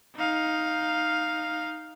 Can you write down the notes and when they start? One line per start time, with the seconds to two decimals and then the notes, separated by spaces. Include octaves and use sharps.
0.16 D#4 F5